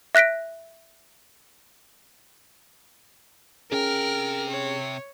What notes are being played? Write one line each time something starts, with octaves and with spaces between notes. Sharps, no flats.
E5 F#6 A#6 B6 D7
C3 C#4 G#4 A#4 G5 F6
C#5